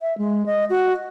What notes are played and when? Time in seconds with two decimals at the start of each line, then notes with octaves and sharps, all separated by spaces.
0.01 E5
0.18 G#3
0.46 D#5
0.70 F#4